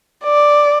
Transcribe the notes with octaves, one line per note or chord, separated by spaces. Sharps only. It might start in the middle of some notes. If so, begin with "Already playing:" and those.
D5